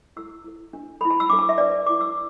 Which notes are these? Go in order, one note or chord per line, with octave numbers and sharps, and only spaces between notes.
E4 A4 E6
E4 A4
D4 A4
E4 A4 B5
A5
E6
D4 A4 D6
A5
E5
D4 B4 D5
E4 A4 D6
E6